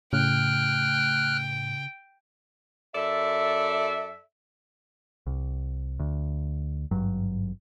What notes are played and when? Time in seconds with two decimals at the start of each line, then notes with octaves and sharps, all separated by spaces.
0.13 A2 C#3 G5 F6 F#6
2.95 F#2 A4 D5 E5
5.27 C2
5.99 D2
6.91 G#1 G2 F#3